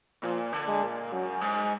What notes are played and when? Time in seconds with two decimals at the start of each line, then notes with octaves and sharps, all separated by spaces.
0.23 A#2 F3
0.53 D3
0.68 G#3
0.83 A#2
1.12 F#2 F#3
1.41 G#2